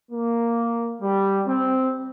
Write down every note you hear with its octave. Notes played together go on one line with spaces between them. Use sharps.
A#3
G3
C4